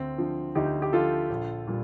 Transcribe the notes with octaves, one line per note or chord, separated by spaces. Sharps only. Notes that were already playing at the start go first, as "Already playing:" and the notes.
Already playing: D2 C4
D3 F3
D2 D#4 G4
G4
D3 F3 F4 A4
A#1
A#2 G3